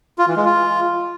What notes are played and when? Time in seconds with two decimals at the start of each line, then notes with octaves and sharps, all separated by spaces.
0.18 F4
0.27 E3
0.36 G#3
0.45 F4